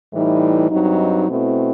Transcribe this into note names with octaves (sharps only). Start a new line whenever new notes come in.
A2 E3 G3 D#4
G2 F#3 C4 D#4
B2 A3 C4 E4